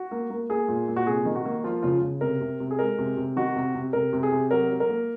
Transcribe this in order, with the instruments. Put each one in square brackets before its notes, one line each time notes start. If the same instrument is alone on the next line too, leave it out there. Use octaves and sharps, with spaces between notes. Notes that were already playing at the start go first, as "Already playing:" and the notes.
Already playing: [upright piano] F#4
A#3
A#3
A#3 G#4
A#2
A#2
F#4
C3 G#4
D#3
F#4
A#3
F3 F4
C#3 F4
C#3
C3 A#4
C3
C3
G#4
G#3 A#4
C3
C3
D#3 F#4
C3
C3
C3 A#4
C3
G#4
C3
F#3 A#4
F#3
A#4
A#3